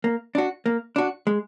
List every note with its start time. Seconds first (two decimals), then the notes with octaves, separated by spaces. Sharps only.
0.04 A#3
0.35 D4 F#4
0.66 A#3
0.96 D4 F#4
1.27 G#3